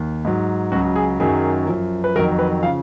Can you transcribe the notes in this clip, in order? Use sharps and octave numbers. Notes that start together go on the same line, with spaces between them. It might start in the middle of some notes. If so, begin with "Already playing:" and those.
Already playing: D#2
G#2 F#3
C#2 C#3 F#3 F#4
G#4
F#2 D#3 F#3 G#4
F#2 F3
B4
F2 D#3 F#3 A#4
B4
C#3 F3 F5